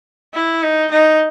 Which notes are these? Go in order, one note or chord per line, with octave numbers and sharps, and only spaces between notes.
E4
D#4
D#4